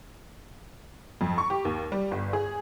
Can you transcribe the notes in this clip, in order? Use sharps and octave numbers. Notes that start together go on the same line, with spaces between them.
F2
C#6
G4
D#2
G3
G1
G#4